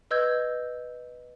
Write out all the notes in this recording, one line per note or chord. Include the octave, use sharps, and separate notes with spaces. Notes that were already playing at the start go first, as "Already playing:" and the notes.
B4 D#5 E6 G6 G#6